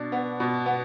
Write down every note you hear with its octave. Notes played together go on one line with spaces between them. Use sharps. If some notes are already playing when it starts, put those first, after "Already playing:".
Already playing: B2 D4
B3
B2
B3